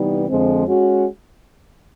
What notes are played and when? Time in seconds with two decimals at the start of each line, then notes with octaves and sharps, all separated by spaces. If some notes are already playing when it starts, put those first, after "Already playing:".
Already playing: C3 E3 G3 B3 D#4
0.28 F2 D3 F3 G#3 C4
0.67 G#3 C#4 F#4